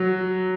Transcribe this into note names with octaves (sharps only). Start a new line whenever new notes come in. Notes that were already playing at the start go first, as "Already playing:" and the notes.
Already playing: F#3